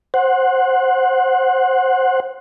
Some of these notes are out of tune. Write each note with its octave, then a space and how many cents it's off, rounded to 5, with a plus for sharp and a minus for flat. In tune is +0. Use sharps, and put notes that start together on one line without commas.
C5 +15 F#5 -5